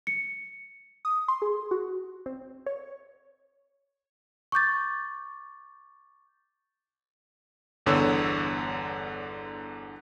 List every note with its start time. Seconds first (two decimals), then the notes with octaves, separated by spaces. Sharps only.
0.07 C#7
1.05 D#6
1.28 C6
1.42 G#4
1.71 F#4
2.26 C4
2.66 C#5
4.52 C#6 D6 G6 A6
7.86 G1 E2 D3 C#5 E6